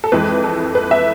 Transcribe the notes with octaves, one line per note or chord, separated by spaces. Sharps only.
A4
F2 E3 G#3 B4
A4
B4
E5